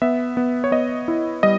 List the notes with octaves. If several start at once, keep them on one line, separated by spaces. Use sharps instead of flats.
B3 E5
B3
C#5
B3 D#5
E4
G3 D#5